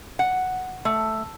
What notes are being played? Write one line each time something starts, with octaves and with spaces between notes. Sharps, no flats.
F#5
A3